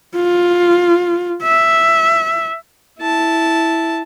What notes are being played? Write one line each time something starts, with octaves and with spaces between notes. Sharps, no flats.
F4
E5
E4 A5